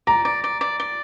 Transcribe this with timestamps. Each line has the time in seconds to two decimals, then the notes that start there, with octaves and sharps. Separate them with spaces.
0.07 D5 A#5
0.25 D5
0.44 D5
0.61 D5
0.80 D5